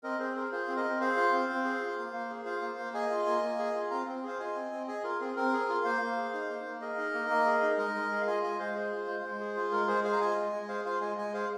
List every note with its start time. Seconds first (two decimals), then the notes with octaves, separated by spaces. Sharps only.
0.03 C4 A#4 D#5
0.19 C4 G#4 C5
0.36 G#4 A#4
0.52 F4 G#4 C5
0.69 C4
0.77 A#4 D#5
0.85 C4
1.00 G#4 C5 F5
1.17 F4
1.33 C4
1.49 C4
1.65 G#4
1.81 F4
1.98 A#3
2.13 A#3
2.30 G#4
2.45 F4 C5 F5
2.62 A#3
2.78 A#3
2.94 G#4 D#5 G#5
3.11 F4
3.27 A#3
3.42 A#3
3.59 G#4
3.75 F4
3.90 C4 F5 A#5
4.07 C4
4.23 G#4 C5 F5
4.39 F4 D#5 G#5
4.55 C4
4.72 C4
4.88 G#4 D#5 G#5
5.03 F4 A#4
5.20 C4 G#4
5.36 C4 A#4
5.53 G#4
5.69 F4
5.84 A#3 C5 F5
6.01 A#3
6.17 G#4
6.33 D#4
6.49 A#3
6.65 A#3
6.81 G#4 A#4 D#5
6.98 D#4
7.14 A#3
7.30 A#3
7.46 G#4
7.62 D#4
7.78 G#3 A#4 D#5
7.95 G#3
8.11 G#4
8.21 F5
8.27 F4 D#5 G#5
8.43 G#3 D#5 G#5
8.59 G#3 C5 F5
8.75 G#4 C5
8.92 F4
9.08 G#3
9.24 G#3
9.40 G#4
9.56 F4
9.72 G#3 A#4
9.88 G#3 G#4 C5
10.04 G#4 C5 F5
10.13 A#5
10.20 F4 D#5 G#5
10.36 G#3
10.53 G#3
10.62 D#5
10.68 G#4 C5 F5
10.85 F4 C5 F5
11.01 G#3 D#5 G#5
11.17 G#3 D#5 G#5
11.34 G#4 C5 F5